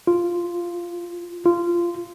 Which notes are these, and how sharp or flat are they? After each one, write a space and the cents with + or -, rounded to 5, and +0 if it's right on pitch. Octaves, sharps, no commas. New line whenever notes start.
F4 -5
F4 -15